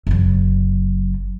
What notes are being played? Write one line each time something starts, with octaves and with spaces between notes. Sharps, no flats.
F#1 F#3